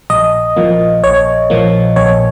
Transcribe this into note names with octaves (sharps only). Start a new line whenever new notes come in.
A#1 D#5
A#2 F3 A#3
A#1 C#5
A#2 F3 A#3
A#1 C#5